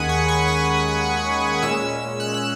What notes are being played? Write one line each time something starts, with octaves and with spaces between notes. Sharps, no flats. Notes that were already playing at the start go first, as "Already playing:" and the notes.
Already playing: D#2 D#3 G#3 C#4 F#5 G#5 B5 D#6
C#6
C#6
D#6
A#2 G#3 C#4 E6
F#6
E6